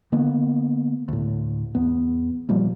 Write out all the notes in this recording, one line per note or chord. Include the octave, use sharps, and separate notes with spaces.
D3 A#3 B3
D2 A2
E2 B3
A#2 F3 G3 A#3